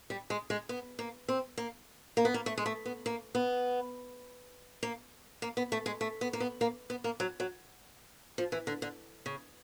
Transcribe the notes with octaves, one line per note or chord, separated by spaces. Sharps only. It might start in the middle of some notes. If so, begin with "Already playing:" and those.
G3
G#3
G#3
B3
A#3
C4
A#3
A#3
B3
A#3
A3
G#3
A3
B3
A#3
B3
A#3
A#3
B3
A3
G#3
A3
B3
A#3
B3
A#3
B3
A#3
F#3
F#3
F3
E3
D3
D3
C#3